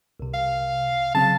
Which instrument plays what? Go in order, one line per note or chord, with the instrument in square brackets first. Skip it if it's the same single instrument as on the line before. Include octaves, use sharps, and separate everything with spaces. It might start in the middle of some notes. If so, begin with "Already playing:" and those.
[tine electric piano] C2 C3
[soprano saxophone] F5
[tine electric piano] C#3 F#3 C4 [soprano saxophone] A5